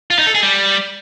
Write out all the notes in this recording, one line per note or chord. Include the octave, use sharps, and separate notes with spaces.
F4
D#4
A4
G#4
G3